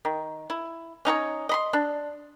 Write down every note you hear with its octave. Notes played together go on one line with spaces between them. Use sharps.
D#3
E4
C#4 D#4 F#4 C#5
D#5 B5 C6
D4